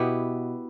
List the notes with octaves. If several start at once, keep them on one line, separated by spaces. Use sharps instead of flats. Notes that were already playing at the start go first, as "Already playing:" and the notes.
Already playing: B2 B3 E4 G4